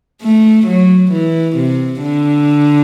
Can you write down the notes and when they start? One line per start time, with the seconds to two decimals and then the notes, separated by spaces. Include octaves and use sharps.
0.22 A3
0.66 F#3
1.12 E3
1.57 C3
2.02 D3